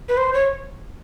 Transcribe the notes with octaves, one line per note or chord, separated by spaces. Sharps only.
B4
C5
C#5